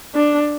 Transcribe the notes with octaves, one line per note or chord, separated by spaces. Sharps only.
D4